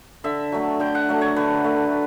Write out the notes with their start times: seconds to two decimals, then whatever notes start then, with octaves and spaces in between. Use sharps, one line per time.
0.24 D3 E5
0.52 F#3 A3
0.80 D3 G5
0.95 F#5
1.09 F#3 A3
1.21 C#5
1.36 D3 B4
1.64 A3